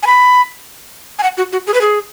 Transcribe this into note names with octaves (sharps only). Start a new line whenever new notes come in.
G#5
B5
G#5
F#5
F#4
F#4
G#4
B4
G#4